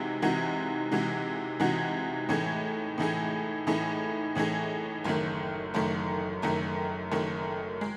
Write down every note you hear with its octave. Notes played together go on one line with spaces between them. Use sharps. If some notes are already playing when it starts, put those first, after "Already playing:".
Already playing: C3 E3 G#3 D#4 F#4
C3 E3 G#3 D#4 F#4
C3 E3 G#3 D#4 F#4
C3 E3 G#3 D#4 F#4
A2 E3 A3 D#4 G#4
A2 E3 A3 D#4 G#4
A2 E3 A3 D#4 G#4
A2 E3 A3 D#4 G#4
F#1 F#2 D#3 A3
F#1 F#2 D#3 A3
F#1 F#2 D#3 A3
F#1 F#2 D#3 A3
G#3